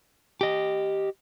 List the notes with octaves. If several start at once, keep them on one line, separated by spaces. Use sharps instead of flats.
G4 D#5